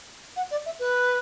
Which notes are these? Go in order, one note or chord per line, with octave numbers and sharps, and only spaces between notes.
F#5
D5
E5
B4